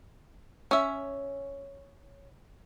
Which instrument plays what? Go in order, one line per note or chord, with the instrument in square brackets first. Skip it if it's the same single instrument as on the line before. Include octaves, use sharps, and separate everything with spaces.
[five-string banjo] C#4 E5